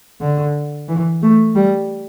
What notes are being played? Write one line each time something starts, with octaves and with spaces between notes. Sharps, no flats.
D3
E3
A3
G3